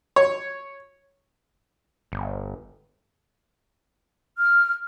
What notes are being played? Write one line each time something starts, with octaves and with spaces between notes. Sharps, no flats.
C#5
G1
F6